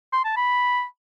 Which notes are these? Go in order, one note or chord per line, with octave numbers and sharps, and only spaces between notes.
C6
A5
B5